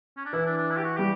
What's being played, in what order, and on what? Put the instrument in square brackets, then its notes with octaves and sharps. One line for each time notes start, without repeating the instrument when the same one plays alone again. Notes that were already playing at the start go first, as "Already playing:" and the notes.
[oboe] C#4
D4
[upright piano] E3 [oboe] E4
[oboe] D4
D4
E4
G4
F#4
[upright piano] G3 [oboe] G4